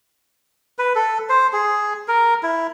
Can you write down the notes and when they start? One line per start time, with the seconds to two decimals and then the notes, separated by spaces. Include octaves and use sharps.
0.79 B4
0.95 A4
1.29 C5
1.53 G#4
2.08 A#4
2.43 E4